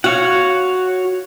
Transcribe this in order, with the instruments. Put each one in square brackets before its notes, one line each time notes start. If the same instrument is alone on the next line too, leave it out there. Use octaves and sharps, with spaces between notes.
[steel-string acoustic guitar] F#4 [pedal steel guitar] C#5 F5 F#5